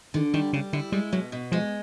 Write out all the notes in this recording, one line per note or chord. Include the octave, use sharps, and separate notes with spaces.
D3 D#3
D#3 G3
C#3 G3
D3 E4
G3 G#3
B2 F#3
B2
F3 G#3